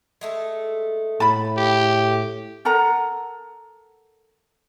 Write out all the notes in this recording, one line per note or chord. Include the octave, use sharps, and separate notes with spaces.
G#3 A3 A4
A2 A5 B5
G4
A4 A#4 F#5 A#5